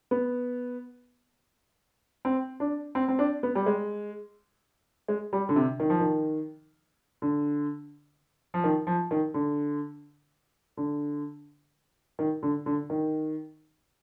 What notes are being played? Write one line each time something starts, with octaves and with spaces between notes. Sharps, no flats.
B3
C4
D4
C4
C4
D4
B3
G3
G#3
G#3
G3
D3
C3
D#3
F3
D#3
D3
F3
D#3
F3
D#3
D3
D3
D#3
D3
D3
D#3